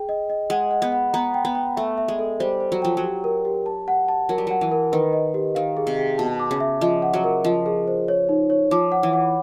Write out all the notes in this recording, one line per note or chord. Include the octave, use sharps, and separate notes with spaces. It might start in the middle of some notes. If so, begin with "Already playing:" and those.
Already playing: G#4 G5
D#5
D#5
G#3 F#5
F#5
B3
F#5
B3 A#5
G5
B3
G5
A3 E5
E5
G#3
A4
G3 C5
C5
F#3
F3 G5
F#3
G4
A#4
G4
A5
F#5
A5
F#3 A#4
G3
F#3 F#5
E3
A#4
D#3 B4
D#5
G4
D#3 F5
G#4
C3
G#4
B2 A5
D6
C#3
E5
F3 D#5
F#5
F#3
A#4
F3 D#5
G#4
C5
C#5
D#4
C#5
F3 D6
F#5
E3
F#5